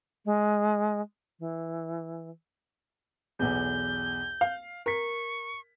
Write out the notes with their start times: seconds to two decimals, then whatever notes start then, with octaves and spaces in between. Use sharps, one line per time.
0.25 G#3
1.39 E3
3.39 B1 E2 G6
4.41 F5
4.86 A#4 C#6 B6